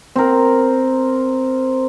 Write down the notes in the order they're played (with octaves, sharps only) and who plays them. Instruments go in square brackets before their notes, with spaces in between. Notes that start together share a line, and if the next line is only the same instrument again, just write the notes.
[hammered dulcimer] C4 A#4